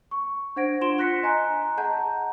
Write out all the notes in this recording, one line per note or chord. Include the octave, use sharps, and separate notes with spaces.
C#6
D4 C5 F#5 G#6 A#6 D7
D4 F4 C6 D7 E7 G7
C6 F#6 A#6 B6 C#7
D#5 G#5 A#5 F#6
G#4 D#5 F#5 A5 A#5 G6